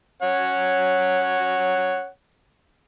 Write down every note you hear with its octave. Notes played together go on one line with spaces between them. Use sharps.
C#4 C#5 F#5